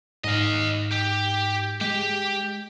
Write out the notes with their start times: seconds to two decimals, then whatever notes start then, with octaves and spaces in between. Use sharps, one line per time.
0.24 G#2 D#5 F5
0.91 G4
1.81 G#3 G4